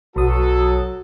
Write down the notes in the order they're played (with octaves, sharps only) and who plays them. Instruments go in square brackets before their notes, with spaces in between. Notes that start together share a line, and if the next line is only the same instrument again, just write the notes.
[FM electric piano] B1 D#6 [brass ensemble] F#3 F#4 A4